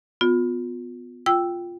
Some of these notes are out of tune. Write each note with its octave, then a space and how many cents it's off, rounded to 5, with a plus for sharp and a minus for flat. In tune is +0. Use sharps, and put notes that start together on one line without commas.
B3 +15 F4 +30
F4 +0 G5 -5 E6 +0